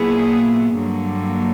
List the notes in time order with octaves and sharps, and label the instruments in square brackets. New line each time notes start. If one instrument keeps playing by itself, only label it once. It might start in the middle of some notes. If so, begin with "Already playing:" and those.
Already playing: [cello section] A#2 F#3 B3 E4 G#4
G2 D3 F#3 A#3